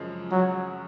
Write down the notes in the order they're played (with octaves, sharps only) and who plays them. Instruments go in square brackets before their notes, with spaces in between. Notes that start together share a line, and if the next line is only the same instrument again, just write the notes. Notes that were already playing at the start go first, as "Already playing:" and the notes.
Already playing: [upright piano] F#2 C#3 F3 G#3
[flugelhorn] F#3